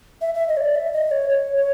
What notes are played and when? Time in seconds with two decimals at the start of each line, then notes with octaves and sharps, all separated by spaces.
0.21 E5
0.35 E5
0.48 D#5
0.57 C#5
0.62 D5
0.75 E5
0.93 D#5
1.11 C#5
1.29 C#5
1.56 C#5